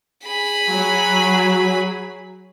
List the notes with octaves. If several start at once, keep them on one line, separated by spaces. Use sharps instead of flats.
G#4 B5
F#3